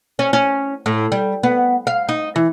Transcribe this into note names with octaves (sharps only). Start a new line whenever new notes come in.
C#4
C#4
A2
G3
B3
F5
D#4
E3